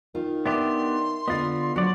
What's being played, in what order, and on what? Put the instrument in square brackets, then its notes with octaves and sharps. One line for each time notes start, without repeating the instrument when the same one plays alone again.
[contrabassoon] D#3 [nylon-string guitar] F4
[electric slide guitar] B3 D4 G4 [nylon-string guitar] E5 [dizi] C6
[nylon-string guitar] D3 D#5 [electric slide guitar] B3 F4
[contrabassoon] A#1 [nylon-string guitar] F#3 [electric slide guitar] F#4 D5